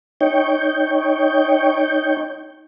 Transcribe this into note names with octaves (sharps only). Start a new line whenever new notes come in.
D#4 C#5 G5